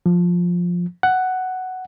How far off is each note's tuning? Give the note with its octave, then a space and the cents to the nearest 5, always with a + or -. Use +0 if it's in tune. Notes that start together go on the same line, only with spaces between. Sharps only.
F3 +10
F#5 +5